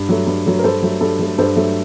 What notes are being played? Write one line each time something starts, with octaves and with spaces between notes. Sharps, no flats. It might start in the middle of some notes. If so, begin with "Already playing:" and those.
Already playing: G2
F#3 A3
G2
F#3 A3
A#4
G2 A4 C5
F#3 A3
G2 A4
F#3 A3
G2 A4 C5
F#3 A3